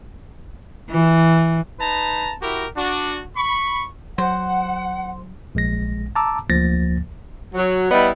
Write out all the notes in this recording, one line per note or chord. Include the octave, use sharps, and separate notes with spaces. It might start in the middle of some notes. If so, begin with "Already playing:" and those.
E3
D#4 B4 A5 A#5
E4 F#4 G4 A#4
D4 F#4
B5 C#6
F#3 C5 F#5
A#1 G#3 A#6
A5 A#5 D6 E6
D2 F3 A#3 A6 A#6
F#3
G3 B3 E4 D#5